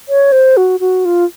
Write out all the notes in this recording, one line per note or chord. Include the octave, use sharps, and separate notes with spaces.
C#5
C5
F#4
F#4
F4